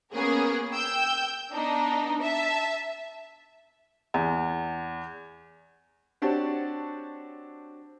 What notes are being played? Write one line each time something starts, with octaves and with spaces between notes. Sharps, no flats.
A#3 B3 C#4 G#4 A#4
G5 E6 G6
B3 D4 D#4
E5 A5
E2
C4 D4 F#4 G4 C#5 A5